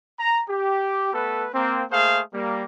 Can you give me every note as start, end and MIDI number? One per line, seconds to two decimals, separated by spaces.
0.20 0.43 82
0.49 1.11 67
1.14 1.49 57
1.14 1.49 59
1.14 1.49 69
1.14 1.49 71
1.54 1.85 58
1.54 1.85 60
1.91 2.23 57
1.91 2.23 58
1.91 2.23 68
1.91 2.23 72
1.91 2.23 77
2.34 2.65 55
2.34 2.65 58